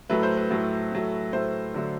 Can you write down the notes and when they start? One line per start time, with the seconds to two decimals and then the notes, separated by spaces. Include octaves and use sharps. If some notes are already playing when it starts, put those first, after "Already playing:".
0.09 A2 F#3 A3 B4
0.23 C5
0.37 B4
0.51 A2 F#3 A3
0.92 A2 F#3 A3
1.33 A2 F#3 A3 C5
1.74 D3 F#3 A3